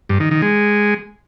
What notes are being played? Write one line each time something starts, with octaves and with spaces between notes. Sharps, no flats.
G2
D#3
D#3
G#3